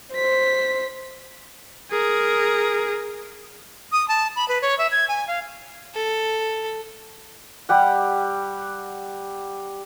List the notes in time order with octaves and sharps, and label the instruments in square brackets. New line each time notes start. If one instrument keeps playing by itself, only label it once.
[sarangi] C5 [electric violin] B6
[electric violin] G#4 A#4
[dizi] D#6
A5
B5
B4
C#5
E5
G#6
G#5
F5
[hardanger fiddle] A4
[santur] G3 G4 F#5